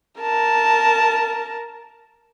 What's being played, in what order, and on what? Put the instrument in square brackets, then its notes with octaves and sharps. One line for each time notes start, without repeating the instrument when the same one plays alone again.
[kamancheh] A#4 A5